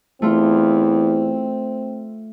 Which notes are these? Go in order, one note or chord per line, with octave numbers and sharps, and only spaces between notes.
E2 A3 C4 F4